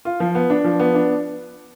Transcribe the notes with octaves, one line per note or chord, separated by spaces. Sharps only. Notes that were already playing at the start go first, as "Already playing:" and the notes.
F4
F3
B3
D4
F3
B3
D4